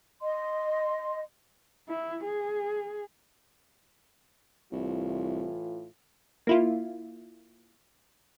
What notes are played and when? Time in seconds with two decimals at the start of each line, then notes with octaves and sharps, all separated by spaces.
0.23 D#5 C6
1.89 E4
2.25 G#4
4.72 C2 A2 E3 F4
6.47 A#3 E4 F4